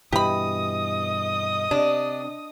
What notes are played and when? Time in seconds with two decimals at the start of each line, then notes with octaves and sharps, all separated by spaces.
0.12 G2 B2 E3 G4 D#5 B5 D#6
1.71 C3 D4